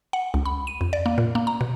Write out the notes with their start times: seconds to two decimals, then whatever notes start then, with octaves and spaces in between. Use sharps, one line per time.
0.13 F#5
0.34 C#2
0.45 B5
0.67 D#7
0.81 F2
0.93 D5
1.06 A#3
1.18 A#2
1.35 A#3
1.47 A#5
1.61 B2